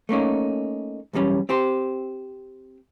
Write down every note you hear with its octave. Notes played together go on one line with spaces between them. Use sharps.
A3 A#3 C#4 D#4
B1 E2 G3 C#4
C4 G4 C5